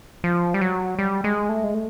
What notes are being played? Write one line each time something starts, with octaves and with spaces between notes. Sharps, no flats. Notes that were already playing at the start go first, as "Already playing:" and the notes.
F3
G3
F#3
G3
G#3
A3
G#3
A3